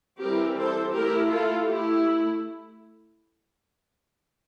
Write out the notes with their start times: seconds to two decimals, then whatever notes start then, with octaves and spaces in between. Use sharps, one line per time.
0.21 E3 G3 C4 E4 G4 A#4
0.57 A4 C5
0.93 A3 E4 G4 A#4
1.30 F4 A4
1.65 A3 E4 G4